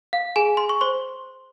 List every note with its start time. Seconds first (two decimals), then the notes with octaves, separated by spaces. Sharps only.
0.13 F5
0.36 G#4 G#5
0.57 C6
0.69 C#6
0.81 C5 C6